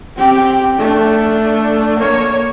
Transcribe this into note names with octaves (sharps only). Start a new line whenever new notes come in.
C4 G4
A3 D4
A#3 C#5